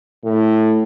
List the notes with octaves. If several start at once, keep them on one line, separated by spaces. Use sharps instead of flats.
A2